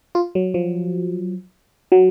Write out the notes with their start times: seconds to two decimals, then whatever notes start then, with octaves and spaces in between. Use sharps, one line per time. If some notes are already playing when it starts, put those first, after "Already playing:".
0.15 F4
0.35 F#3
0.54 F3
1.92 F#3